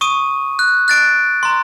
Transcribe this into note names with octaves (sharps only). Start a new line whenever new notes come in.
C#6 D#6 D#7
F#6
F#6 A6 D7
A#5 C6